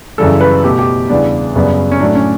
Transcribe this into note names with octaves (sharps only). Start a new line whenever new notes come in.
F#2 C#3 E3 G3 A4
B4
B2 A3 G4
G4
E2 C#3 G3 B3 D4
F#2 C#3 G3 B3
C#4
A2 F#3 A3 D4
C#4